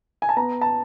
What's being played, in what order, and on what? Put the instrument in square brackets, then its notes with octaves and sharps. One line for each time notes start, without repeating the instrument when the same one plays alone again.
[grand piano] G#5
A5
B3 A#5
A5